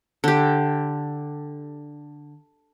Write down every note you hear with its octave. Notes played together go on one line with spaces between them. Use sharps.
D3 G4